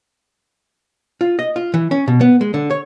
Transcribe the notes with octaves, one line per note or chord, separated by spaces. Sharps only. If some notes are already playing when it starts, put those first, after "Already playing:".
F4
D#5
F4
E3
C#4
B2
B3
G#3
D3
C#5